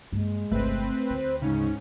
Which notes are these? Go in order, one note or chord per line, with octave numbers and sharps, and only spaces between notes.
G2 G#3 A#3
G1 C2 A3 C4 B4
D2 C5
G#2 C#3 C#4 D#4